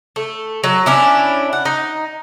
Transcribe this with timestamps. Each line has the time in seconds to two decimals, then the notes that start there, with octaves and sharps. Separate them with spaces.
0.16 A3
0.64 F#3
0.86 C#4 D4 E4
1.53 F#5
1.65 D#4